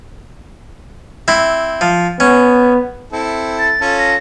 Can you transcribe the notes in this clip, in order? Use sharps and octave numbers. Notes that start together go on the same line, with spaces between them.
C4 E4
F3
B3 C#4
C4 E4 A4
A6
C#4 F4 A4
A#6